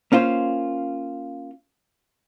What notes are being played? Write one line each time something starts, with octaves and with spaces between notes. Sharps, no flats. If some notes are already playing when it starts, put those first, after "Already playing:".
A#3 C#4 F4 C5